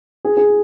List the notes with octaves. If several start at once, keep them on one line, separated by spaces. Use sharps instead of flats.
G#4
G#4